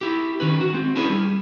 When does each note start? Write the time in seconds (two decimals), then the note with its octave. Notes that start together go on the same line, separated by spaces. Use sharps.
0.01 E4 G4
0.40 D#3 C#4 B4
0.61 F#4
0.73 G#3 C4
0.96 C#4 D4 E4 G#4 B4
1.10 G3